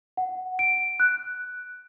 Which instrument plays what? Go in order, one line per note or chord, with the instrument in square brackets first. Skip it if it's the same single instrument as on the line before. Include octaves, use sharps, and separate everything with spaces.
[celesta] F#5
D7
F#6